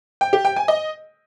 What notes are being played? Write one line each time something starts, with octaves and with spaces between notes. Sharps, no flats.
G5
G4
G5
G#5
D#5